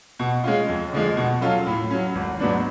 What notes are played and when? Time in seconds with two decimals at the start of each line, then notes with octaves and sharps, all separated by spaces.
0.19 B2
0.44 G#3 C#4 F4
0.68 F2
0.93 D3 F3 G#3
1.17 B2
1.41 F#3 C#4 F4 A4
1.67 A2
1.91 F#3 C#4
2.15 G#1
2.39 G#2 F#3 B3 D4